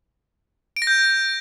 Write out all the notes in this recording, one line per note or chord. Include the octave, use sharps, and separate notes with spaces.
D7
A#6
G6